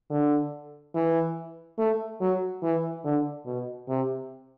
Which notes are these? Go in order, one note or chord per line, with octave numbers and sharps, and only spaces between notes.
D3
E3
A3
F#3
E3
D3
B2
C3